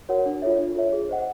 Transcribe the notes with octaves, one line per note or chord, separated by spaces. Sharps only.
F#4 A#4 C#5 F#5
D4
F4 A4 C#5 E5
D4
F4 A4 C#5 E5
G#4
C5 D#5 F#5